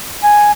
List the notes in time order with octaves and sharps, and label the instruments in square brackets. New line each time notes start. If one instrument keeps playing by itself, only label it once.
[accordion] G#5